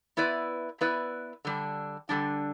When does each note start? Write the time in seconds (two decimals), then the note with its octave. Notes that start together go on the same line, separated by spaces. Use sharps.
0.17 B3 E4 B4 D5
0.81 B3 E4 B4 D5
1.45 D3 G3 D4
2.09 D3 G3 D4